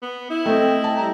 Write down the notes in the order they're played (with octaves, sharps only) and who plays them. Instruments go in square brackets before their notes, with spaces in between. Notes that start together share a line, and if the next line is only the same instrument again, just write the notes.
[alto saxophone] B3
E4
[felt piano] A3 C4 [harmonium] D#5 G5
[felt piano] A5
[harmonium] G3 A#5